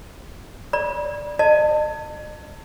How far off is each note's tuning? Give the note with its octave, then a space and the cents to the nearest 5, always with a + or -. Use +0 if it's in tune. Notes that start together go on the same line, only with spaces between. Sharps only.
D5 +0 B5 -45
D#5 -45 A5 +25